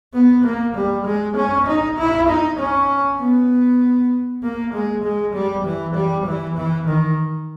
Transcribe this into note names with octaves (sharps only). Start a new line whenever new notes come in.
B3
A#3
G3
G#3
C#4
D#4
E4
D#4
C#4
B3
A#3
G#3
G#3
G3
E3
G3
E3
E3
D#3